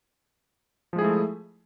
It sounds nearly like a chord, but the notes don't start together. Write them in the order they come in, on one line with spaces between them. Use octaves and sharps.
F3 G#3 G#4 E4 A3